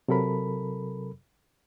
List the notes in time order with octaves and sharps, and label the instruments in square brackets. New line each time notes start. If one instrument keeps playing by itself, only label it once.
[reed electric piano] C3 F#3 A4 A#4 B5